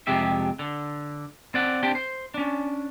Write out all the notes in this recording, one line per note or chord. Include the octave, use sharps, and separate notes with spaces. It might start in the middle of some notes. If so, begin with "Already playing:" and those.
F2 C3 G#3 G4 E5
D3
C4 D5 F#5
C4 D4 G4 G5
C5
C#4 D4